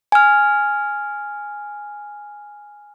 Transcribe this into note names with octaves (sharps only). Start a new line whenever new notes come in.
G#5 F6